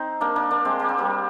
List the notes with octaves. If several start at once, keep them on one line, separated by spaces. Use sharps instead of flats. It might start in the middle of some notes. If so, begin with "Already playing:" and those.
Already playing: C4 D#4
A#3 D4
A#3 D4
A#3 D4
G#3 C4
A#3
C4
G3 A#3